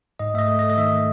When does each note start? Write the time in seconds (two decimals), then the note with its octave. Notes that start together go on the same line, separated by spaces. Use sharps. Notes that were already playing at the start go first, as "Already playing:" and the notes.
0.19 G#2 D#5
0.34 A3 E5
0.39 D#5
0.48 A3
0.59 D#5
0.63 A3
0.70 D#5
0.77 D#3 E5
0.93 A3